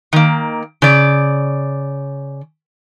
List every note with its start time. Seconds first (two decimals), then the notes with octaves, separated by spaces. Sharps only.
0.13 D#3 A#3
0.82 C#3 D5